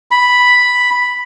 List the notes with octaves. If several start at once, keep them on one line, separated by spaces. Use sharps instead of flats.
B5